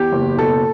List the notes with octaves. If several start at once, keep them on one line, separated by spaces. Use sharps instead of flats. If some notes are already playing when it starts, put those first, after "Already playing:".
Already playing: E2 G4
F#1
B2 A4